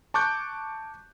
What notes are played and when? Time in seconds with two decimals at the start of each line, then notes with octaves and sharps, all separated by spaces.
0.14 A5 C#6 D6 F#6 G6